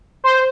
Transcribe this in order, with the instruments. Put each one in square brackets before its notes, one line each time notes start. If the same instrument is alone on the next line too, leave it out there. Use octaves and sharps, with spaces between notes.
[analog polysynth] C5